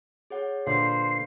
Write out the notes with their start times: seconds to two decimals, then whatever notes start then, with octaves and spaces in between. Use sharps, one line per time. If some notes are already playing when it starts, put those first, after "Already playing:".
0.30 G#4 C#5 F#5
0.67 A#2 D3 B4 C5 F5 C7